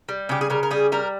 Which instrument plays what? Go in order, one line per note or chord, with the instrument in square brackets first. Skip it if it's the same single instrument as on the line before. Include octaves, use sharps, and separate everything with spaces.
[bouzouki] G3
C#3 G4
G#4
C#3 A#4
A#4
G3 G#4
G3 A#4